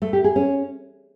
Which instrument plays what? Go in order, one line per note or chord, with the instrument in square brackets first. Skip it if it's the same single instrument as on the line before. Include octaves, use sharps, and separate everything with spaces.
[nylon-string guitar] A3
G4
G#4
C#4